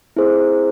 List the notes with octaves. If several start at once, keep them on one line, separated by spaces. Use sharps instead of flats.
C4 E4 G#4 C5